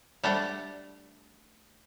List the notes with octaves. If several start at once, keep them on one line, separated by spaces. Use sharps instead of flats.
G3 A3 D4 G4 F#5 G5